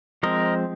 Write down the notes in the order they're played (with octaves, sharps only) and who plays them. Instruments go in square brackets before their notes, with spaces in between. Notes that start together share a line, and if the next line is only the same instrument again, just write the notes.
[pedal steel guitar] F3 G#3 C4 A#4 D#5